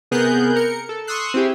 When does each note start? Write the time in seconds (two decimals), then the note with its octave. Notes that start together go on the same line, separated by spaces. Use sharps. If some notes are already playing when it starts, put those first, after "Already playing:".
0.11 C3 B3 G#4 A#4 F#6 G6
0.56 A#4 C#7
0.89 A4
1.07 C6 C#6 D#6 E6 F#6 C7
1.34 C4 E4 G4 G#4